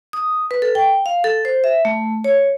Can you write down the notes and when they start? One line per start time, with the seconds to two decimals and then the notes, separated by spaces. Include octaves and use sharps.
0.13 D#6
0.51 B4
0.62 A4
0.75 G5
1.06 F5
1.24 A4
1.45 C5
1.64 E5
1.85 A3
2.24 C#5